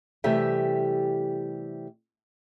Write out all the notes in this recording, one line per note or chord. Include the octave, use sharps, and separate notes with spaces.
C3 E3 G3 A3 G4 E5